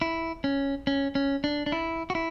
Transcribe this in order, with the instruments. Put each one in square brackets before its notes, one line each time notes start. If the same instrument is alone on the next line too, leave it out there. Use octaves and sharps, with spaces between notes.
[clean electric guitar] E4
C#4
C#4
C#4
D4
D4
E4
F#4
E4